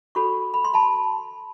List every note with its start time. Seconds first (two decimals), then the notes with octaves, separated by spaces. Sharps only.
0.15 F#4 A4 C#5 B5 C#6
0.54 B5
0.65 C6
0.74 A5 B5